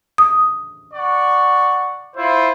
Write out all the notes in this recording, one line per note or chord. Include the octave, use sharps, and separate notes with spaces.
D#6
D5 F#5 C#6
E4 F4 C5